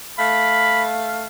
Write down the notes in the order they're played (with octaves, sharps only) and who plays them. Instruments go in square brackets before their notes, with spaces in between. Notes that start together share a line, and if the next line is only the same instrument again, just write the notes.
[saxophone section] A3 F5 [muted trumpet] B5